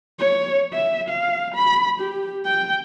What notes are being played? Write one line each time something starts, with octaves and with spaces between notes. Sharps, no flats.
C#5
E5
F5
B5
G4
G5